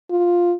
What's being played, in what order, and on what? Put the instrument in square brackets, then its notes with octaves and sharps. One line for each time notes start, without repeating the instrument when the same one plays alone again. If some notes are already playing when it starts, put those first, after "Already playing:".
[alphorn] F4